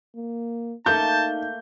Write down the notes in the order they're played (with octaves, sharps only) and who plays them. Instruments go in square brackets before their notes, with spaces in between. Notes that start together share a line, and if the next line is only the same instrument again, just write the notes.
[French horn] A#3
[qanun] A3 A#3 [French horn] D#4 [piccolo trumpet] A5 [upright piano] G6